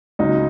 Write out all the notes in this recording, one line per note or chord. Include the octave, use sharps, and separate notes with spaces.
C#2 C#3 F#3 D#4